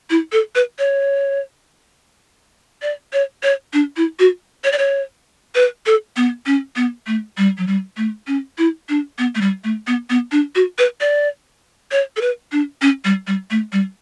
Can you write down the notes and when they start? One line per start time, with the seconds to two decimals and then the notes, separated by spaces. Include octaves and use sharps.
0.10 E4
0.32 A4
0.55 B4
0.79 C#5
2.82 D5
3.13 C#5
3.43 C#5
3.73 D4
3.97 E4
4.19 F#4
4.64 C#5
4.72 D5
4.78 C#5
5.55 B4
5.86 A4
6.16 B3
6.46 C#4
6.76 B3
7.07 A3
7.38 G3
7.58 F#3
7.67 G3
7.97 A3
8.27 C#4
8.58 E4
8.89 D4
9.19 B3
9.35 A3
9.41 G3
9.64 A3
9.87 B3
10.10 B3
10.32 D4
10.55 F#4
10.78 B4
11.01 D5
11.92 C#5
12.17 A4
12.21 B4
12.52 D4
12.82 C#4
13.05 G3
13.27 G3
13.51 A3
13.73 G3